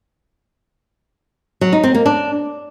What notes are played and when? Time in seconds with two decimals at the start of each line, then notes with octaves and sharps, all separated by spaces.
1.61 F#3
1.72 D#4
1.84 C4
1.95 A#3
2.06 D4